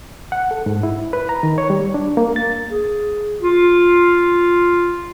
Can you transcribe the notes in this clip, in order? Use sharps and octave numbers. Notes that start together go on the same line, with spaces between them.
F#5
A4
G#2
E4
B4
A#5
D#3
C#5
G3
D4
A#3
A6
G#4
F4